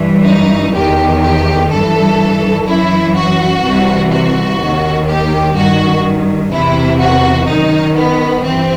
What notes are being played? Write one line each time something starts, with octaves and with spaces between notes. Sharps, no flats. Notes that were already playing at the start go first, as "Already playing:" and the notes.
Already playing: G2 E3
D#4
E2 D#3 G4
G4
G2 E3 A4
F#2 E3 E4
F#4
C2 C3 E3
F#4
D#2 D#3
G4
G2 D#3 F#4
E2 C3 E3 E4
F#4
F#2 D#3 D#4
B3
G2 E3 C4